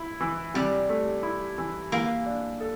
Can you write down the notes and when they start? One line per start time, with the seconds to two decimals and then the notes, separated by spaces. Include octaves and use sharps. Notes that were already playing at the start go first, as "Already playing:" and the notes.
Already playing: E4
0.20 E3
0.54 C3 G3
0.89 A3
1.23 E4
1.58 E3
1.92 E3 A#3
2.26 D4
2.60 A4